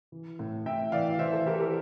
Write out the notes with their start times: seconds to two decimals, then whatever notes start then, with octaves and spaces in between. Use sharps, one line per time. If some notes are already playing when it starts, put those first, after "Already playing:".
0.12 E3
0.39 A2
0.66 A2 E5 G5
0.92 E3 D5 F5
1.19 E3 C5 E5
1.32 A4 C5
1.46 E3 G4 A#4
1.54 A4
1.60 G4 A#4